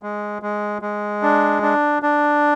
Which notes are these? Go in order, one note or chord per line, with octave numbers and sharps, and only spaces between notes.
G#3
G#3
G#3
D4
D4
D4